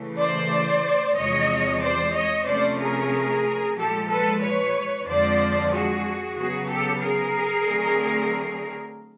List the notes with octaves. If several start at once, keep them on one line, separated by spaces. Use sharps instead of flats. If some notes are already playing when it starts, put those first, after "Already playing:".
Already playing: C#3 E3 A3
C5 D5
E2 C3 F3 G#3 C#5 D#5
C5 D5
C#5 D#5
C3 F3 A3 C#4 C5 D5
G#4 A#4
A#2 F3 G#3 G4 A4
A4 B4
B4 C#5
F2 D3 F3 G#3 C5 D5
F#4 G#4
C#3 F#3 B3 F#4 G#4
G4 A4
G#4 A#4
D3 F#3 A3 C4